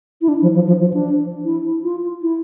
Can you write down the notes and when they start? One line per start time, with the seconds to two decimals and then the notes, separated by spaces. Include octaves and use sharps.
0.21 E4
0.28 D4
0.42 F3
0.55 F3
0.67 F3
0.80 F3
0.93 D4
1.45 E4
1.84 F4
2.22 E4